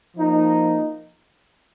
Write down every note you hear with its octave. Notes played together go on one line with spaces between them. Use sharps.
F3 A#3 D#4